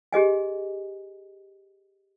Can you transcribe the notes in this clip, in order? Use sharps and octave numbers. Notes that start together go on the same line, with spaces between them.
G4 G#4 D#5 G#5